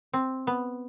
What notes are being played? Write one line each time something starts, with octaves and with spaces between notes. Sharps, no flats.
C4
B3